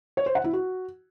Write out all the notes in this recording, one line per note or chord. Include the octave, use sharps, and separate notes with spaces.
C#5
C5
F#5
E4
F#4